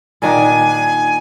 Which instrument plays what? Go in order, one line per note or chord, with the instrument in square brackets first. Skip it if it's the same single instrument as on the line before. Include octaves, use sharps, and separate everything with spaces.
[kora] A#2 D#3 D4 [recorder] G#5